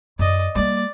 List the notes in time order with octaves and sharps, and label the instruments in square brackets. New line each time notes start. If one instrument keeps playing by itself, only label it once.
[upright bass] F#2 [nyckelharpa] D5 D#5
[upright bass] G3 A#3 [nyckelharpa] D5